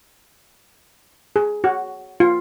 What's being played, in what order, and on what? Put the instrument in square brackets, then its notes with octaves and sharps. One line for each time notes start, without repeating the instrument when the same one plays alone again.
[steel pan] G#4
F#4
F4